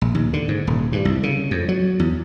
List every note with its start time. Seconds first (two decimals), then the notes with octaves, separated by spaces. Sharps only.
0.02 A#1
0.15 D#2
0.33 D3
0.48 G#2
0.67 D#1
0.92 G2
1.05 C2
1.23 C#3
1.51 F2
1.69 F#3
2.00 E2